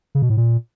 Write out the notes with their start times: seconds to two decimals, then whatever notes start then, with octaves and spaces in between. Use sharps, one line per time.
0.15 C#3
0.22 B2
0.30 A2
0.37 A#2